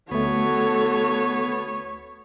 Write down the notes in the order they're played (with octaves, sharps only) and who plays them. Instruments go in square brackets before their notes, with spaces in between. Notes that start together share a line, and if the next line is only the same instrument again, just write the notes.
[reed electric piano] D2 A3 [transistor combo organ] B3 [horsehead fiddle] F#4 A4 [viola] C#5